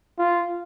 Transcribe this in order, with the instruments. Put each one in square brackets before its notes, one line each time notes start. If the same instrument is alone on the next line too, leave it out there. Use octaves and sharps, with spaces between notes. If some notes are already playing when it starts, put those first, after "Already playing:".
[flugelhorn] F4